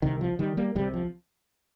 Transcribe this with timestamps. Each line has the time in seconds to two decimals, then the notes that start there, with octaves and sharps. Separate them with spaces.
0.02 C2 C3 D#3
0.21 F3
0.39 D#3 G3
0.57 G3 A#3
0.75 C2 D#3 G3
0.78 C3
0.94 F3